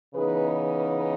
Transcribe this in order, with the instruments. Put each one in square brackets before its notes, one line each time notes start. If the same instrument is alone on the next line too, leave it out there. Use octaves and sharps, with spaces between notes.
[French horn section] C#3 E3 B3 D#4 G#4 B4